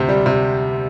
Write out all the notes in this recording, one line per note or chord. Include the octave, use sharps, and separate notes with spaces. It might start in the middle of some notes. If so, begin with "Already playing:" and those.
Already playing: D2 C3 C5
G3
C3